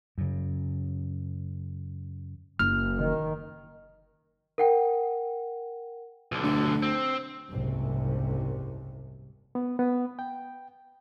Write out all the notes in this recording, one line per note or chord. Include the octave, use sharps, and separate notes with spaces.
F#2 C#3
F#1 F6
D#3
A#4 F#5 G5
B1 D3
D2
C4
F#1 C2 G#2 C3
B3
B3
G5